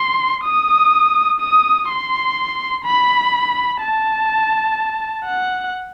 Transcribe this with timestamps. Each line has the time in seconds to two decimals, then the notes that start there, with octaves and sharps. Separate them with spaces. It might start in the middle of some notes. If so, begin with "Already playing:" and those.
Already playing: C6
0.44 D#6
1.40 D#6
1.88 C6
2.84 B5
3.80 A5
5.25 F#5